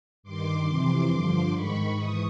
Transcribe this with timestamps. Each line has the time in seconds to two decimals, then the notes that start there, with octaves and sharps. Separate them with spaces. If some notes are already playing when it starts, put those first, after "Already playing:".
0.23 G2 D#3 C6 D6
0.66 F2 C3 E3 C6 D6
1.10 G2 D3 F3 C6 D6
1.53 G#2 D#3 B5 C#6
1.96 G#2 E3 C#6 D#6